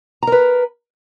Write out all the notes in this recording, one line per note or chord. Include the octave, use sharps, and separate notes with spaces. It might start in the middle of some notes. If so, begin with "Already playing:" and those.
A#4 B4 A#5